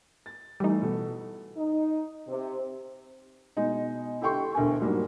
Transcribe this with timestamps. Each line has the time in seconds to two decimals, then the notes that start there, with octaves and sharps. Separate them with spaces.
0.26 A6
0.60 E3 G3 A3 D#4
0.82 B2 A4
1.57 D#4
2.27 C3
3.57 B2 G#3 D#4
4.22 E4 G4 A4 G5 C6 C#6
4.55 E1 D2 A#4 G#5
4.80 G#2 F#3 G3 A#3